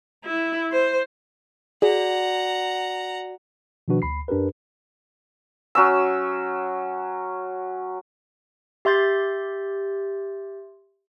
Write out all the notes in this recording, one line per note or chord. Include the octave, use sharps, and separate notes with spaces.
E4
C5
F#4 G#4 D5 F#5 A#5
B2 D#3 F3 D4 F#4 B4
D2 B5 C7
F#2 D4 G4 A#4 B4
F#3 C#4 E6
G4 E5 C6 G6 A6